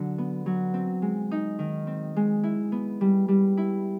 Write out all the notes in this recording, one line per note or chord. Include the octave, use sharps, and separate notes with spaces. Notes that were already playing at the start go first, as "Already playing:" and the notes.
Already playing: D3 F#3 D4
B3
F#3
C4
G#3
D#4
D#3
C4
G#3
E4
B3
G3
G3
E4